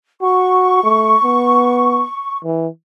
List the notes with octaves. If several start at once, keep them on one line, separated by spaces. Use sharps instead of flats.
F#4 C#6
A3
B3
E3